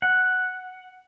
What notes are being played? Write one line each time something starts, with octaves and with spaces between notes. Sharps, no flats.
F#5